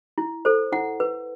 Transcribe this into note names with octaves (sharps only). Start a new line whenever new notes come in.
E4
A4 C5
E4 F#5
B4